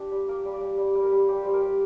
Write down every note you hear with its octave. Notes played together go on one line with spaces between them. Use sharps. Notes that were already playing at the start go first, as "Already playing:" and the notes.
Already playing: D4 F4 G4
G3
A#3 A#4
G3
D5
G3
G3
G3
A#4
G3
G3 G4
G3 C5
A#4
G3